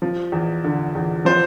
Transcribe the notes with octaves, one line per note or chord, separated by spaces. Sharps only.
F3
E2
D3
E2
F3 C5